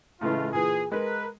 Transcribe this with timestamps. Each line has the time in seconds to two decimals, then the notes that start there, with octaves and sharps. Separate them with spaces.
0.21 A2 C#3 E3 G#3 A3 F4
0.53 A#2 E3 G#4
0.92 G#3 A#4 B4